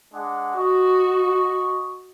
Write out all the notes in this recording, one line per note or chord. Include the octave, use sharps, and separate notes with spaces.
G#3 D4 F#5
F#4 D#5 C#6